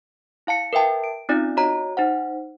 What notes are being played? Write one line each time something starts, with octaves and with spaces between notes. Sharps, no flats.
E4 F5 A5 C#7
A#4 B4 E5 G5 A5
D7
C4 C#4 D#4 F4 D5
F#4 C#5 D#5 A#5
D#4 C5 F#5